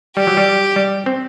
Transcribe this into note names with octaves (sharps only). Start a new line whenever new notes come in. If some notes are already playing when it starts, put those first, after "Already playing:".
G3 G4
F#3
G3
G3
C4